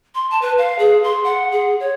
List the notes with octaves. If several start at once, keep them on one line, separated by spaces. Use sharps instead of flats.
C6
A5
B4
F5
G#4
C6
F#5
G#4
C#5